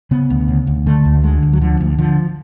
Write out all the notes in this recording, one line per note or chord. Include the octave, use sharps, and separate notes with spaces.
C#3 B3
D2
C#3
D2
D3 A3
D2
D3 G#3
D2
F#3
D3 F3
D2
D3 F3